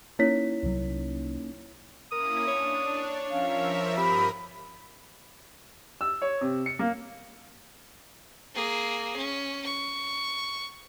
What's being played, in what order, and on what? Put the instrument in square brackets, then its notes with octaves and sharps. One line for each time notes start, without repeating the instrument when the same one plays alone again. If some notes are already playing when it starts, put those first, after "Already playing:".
[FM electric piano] A#3 C#4 D#4 [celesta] E4 C#5 B6
[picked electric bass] C2 F#3
[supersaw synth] A#3 C#4 E4 [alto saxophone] A#4 [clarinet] D#6
[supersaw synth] D4 [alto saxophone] C#5
[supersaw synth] F3 A#4 E5 [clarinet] C#4 [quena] F5
[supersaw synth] G2 A#4 D#6 [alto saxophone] C4 [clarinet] G4 [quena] B5
[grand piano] E6
C#5
C3
C#7
A#3
[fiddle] A#3 G#4
C#4
C#6